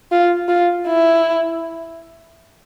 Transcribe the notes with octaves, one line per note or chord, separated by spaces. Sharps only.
F4
F4
E4